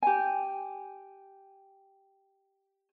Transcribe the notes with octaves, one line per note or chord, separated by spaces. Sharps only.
G4 G#5